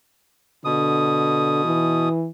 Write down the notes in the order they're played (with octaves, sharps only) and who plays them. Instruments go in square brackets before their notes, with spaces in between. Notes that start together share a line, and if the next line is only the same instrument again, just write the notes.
[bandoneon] B2 D#6 [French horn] D3
[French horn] E3